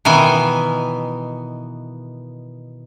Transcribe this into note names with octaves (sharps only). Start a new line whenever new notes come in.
B2 D#3 E3 G#5